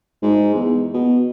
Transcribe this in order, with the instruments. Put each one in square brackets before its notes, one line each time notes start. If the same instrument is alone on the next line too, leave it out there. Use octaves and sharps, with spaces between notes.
[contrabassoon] G#2
E2
B2